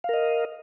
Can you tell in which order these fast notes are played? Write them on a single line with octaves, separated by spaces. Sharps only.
F5 A#4 D#5